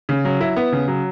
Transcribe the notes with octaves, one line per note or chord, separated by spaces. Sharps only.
C#3
F#3
E4
B3
C#3
F#3